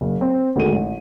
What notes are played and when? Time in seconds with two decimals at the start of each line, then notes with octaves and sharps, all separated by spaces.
0.01 F#1
0.21 C4
0.56 G#1 D2 A3 G#4 D#7
0.72 A1